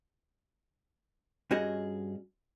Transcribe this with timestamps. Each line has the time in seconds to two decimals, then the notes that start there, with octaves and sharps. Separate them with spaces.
1.51 G2 C#4 F#4 G#4 D#5